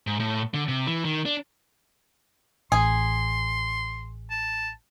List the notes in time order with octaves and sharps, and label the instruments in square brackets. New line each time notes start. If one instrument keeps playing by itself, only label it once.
[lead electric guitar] G#2
A2
D3
C3
E3
D#3
D4
[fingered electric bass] A1 [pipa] G#4 [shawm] C6
[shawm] A5